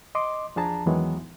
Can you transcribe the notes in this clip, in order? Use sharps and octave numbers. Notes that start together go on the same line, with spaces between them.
D#5 C6 D6
E2 F3 D4 G#4 A5 A#5
E2 D#3 E3 F#3 G#3 B3